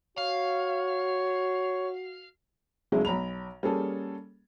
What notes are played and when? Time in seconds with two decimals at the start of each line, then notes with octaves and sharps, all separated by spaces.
0.18 F#4 C#5 F5
2.92 G1 C#3 F#3 G#3 A3 E4
3.05 B1 A#5 B5 F7
3.63 G3 A#3 C#4 G#4 A4